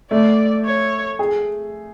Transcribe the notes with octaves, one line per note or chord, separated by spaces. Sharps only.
A3 D5
C#5
G#4